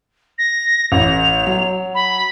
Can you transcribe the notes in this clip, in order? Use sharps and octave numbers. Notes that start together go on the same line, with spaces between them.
A#6
A1 F7
F#3
B5